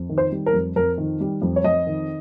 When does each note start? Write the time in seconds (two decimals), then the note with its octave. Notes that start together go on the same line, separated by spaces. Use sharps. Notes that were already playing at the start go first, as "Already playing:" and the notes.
Already playing: F2
0.09 D#3
0.18 C5
0.32 G3
0.46 A#4
0.53 F2
0.76 F2 A#4
0.98 D#3
1.20 G3
1.42 F2
1.56 C#5
1.64 F2 D#5
1.87 D#3